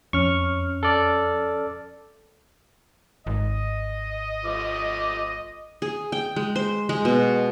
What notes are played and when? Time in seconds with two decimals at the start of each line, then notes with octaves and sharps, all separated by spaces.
0.13 F2 C#4 C#6 F6
0.83 A4 D5
3.26 G#1 D#5
4.44 F3 A3 D6
5.82 G#4
6.12 G5
6.36 G#3
6.56 C5
6.89 G#3
7.05 B2